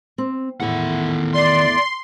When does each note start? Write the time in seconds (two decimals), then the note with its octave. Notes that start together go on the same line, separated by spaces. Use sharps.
0.18 C4
0.60 E2 A2 D#3 E5 F#5
1.33 D5 C6